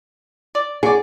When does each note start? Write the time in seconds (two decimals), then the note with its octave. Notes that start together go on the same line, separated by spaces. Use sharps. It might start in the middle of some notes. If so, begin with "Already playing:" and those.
0.55 D5
0.83 F#3 G#4 D5